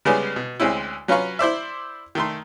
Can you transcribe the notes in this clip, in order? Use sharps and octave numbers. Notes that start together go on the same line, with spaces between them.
C#3 G3 G#3 B3 C#4 G#4
B2
D2 G#3 C4 C#4 E4
F#3 C#4 F4 B4 F5 C#6
E4 C5 D5 E5
D#3 A3 C6